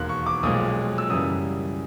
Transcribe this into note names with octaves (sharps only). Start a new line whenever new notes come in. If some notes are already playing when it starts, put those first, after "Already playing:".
Already playing: E1 D#2 D#3 C6 F#6
C#6
D6
B1 A#2 F3 G#3 D#6
E6
F#2 C#3 E3 G3 D#6